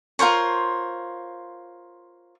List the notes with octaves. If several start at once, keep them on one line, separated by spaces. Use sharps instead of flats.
F4 A#4 C5 C#5